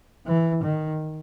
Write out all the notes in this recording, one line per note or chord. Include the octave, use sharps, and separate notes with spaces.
E3
D#3